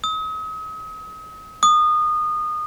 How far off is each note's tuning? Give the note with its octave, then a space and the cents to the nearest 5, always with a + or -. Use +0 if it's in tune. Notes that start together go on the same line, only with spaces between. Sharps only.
D#6 +40
D#6 -25